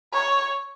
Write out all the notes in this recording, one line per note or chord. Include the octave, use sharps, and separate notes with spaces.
C#5